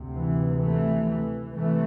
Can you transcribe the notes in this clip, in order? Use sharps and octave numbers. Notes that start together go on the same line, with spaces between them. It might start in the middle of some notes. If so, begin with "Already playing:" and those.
Already playing: D2 C3
E3
E3 A3
E3
C3 E3 A3